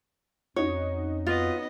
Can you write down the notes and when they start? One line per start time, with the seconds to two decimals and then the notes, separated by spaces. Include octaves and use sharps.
0.56 F2 C#4 D#4 F#4 C#5
1.27 B3 F4 D#5